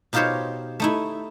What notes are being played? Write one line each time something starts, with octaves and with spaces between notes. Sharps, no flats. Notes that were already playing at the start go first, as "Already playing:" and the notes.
B2 D#4 F4 G4 C5 C#5
A3 D#4 E4